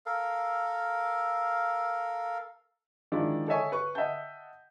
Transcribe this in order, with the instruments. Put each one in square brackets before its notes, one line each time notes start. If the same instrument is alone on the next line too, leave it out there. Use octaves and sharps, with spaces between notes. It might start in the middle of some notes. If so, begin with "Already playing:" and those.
[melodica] A4 A#4 F5
[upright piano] D#3 F3 G#3 D4 E4
A4 C#5 D#5 E5 G#5 C#6
B4 C#6
D#5 E5 F#5 G5 A5 G6